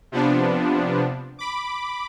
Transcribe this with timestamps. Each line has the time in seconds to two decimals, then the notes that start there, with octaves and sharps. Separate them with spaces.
0.12 C3 F3 B3 D4
1.39 B5 D6